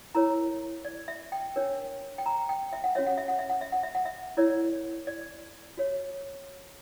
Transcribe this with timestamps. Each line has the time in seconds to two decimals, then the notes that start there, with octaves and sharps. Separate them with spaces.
0.15 E4 A#4 C#5 A#5
0.85 D5
1.08 E5
1.32 G5
1.56 D4 A#4 C#5
2.18 G5
2.26 A#5
2.49 G5
2.73 E5
2.84 F#5
2.95 C#4 F#4 C#5 E5
3.07 F#5
3.18 E5
3.28 F#5
3.39 E5
3.50 F#5
3.61 E5
3.72 F#5
3.83 E5
3.95 F#5
4.05 E5
4.37 E4 A#4 C#5 D5
5.07 D5
5.77 F#4 C#5